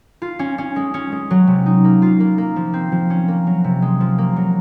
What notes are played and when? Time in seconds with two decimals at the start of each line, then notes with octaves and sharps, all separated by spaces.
0.22 F4
0.39 C#4
0.58 C#4
0.76 G#3
0.94 C#4
1.12 G#3
1.31 F#3
1.47 C3
1.66 D#4
1.84 A#3
2.02 F4
2.20 A#3
2.38 A#3
2.56 F3
2.74 C4
2.92 F3
3.10 C#4
3.28 A#3
3.47 F#3
3.64 C3
3.82 G#3
4.00 F3
4.18 A#3
4.36 F#3